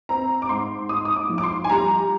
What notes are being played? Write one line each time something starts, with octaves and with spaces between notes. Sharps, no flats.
C4 A#5
D6
G#2 C6
G#2 D#6
D#6
D6
F3
D6
C6
G#5
G3 A#5